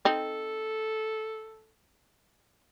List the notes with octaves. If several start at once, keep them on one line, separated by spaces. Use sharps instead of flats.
C4 D#4 A4